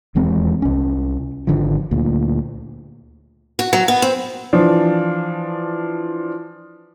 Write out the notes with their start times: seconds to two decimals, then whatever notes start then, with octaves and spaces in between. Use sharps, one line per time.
0.15 D#1 E2 G#3 C4
0.62 C2 C#4
1.47 G#1 D3 F3
1.91 D2 A#2
3.59 F#4
3.73 F#3
3.88 B3
4.02 C4
4.53 E3 F3 D4